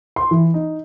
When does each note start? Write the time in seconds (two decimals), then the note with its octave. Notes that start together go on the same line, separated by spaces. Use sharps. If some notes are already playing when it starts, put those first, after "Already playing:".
0.16 C6
0.31 E3
0.54 D#4